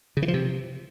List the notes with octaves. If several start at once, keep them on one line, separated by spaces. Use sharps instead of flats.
C#3
E3
F3
C3